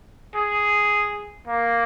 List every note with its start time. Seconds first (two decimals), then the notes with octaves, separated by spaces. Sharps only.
0.35 G#4
1.48 A#3